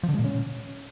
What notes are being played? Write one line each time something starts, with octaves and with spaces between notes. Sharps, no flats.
F3
D3
G#3
A#2
C#4